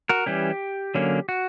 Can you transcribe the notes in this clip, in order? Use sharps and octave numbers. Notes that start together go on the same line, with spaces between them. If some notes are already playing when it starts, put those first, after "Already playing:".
F#4 A#4
E3 G3 C#4 G4
D3 F#3 A#3 C#4
F#4